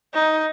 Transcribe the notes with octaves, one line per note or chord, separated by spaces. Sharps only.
D#4